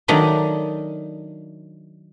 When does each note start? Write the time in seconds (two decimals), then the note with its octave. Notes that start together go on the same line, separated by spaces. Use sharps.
0.08 D#3 F#3 A3 D4 D#4